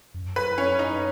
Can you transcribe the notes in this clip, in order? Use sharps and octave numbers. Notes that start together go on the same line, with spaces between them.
F#2
B4
C#4
D#4